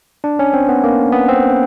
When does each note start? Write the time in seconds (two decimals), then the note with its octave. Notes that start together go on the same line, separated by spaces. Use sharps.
0.24 D4
0.39 C#4
0.54 C4
0.69 B3
0.84 A#3
1.12 B3
1.28 C4